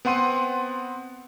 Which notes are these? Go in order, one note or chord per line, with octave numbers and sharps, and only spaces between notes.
B3 C4 F#5 C6 D#7